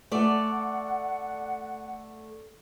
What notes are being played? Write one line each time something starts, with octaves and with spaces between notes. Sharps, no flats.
A3 A4 D5 F#5